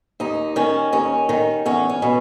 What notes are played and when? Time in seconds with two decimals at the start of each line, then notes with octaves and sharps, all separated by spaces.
0.20 D#2 D#4
0.56 D#3 C#4
0.92 D#2 C#4
1.29 D#3
1.66 E2 C#4
1.90 C#4
2.02 B2